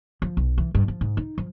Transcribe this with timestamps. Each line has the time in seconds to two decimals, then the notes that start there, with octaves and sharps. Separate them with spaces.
0.22 F3
0.37 B1
0.58 E3
0.75 G2
0.88 F3
1.01 G#2
1.17 D#4
1.38 F3